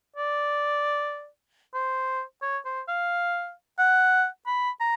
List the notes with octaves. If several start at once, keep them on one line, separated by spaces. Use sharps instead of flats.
D5
C5
C#5
C5
F5
F#5
B5
A#5